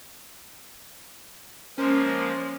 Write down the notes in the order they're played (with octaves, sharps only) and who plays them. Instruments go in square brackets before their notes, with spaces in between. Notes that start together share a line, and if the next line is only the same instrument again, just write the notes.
[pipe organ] F3 G#3 A#3 [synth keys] C#4 [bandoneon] A#4 C5